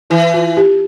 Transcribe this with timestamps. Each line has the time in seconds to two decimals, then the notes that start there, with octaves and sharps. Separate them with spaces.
0.10 E3 E4
0.34 F4
0.57 G4